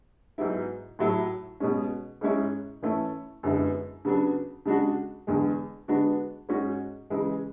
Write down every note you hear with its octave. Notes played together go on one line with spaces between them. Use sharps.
G#2 F#3 B3 E4
A2 F#3 A3 E4
B2 G#3 C#4
G#2 G#3 C#4 E4
E3 A3 C#4 E4
F#2 D3 G#3 B3 E4
C#3 F#3 B3 D4
C#3 G#3 D4 F#4
E2 D3 G#3
D3 G#3 B3 D4 F#4
G#2 G#3 C#4 F#4
C#3 E3 G#3